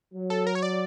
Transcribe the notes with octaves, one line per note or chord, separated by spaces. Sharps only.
F#3
A4
A#4
C#5
D5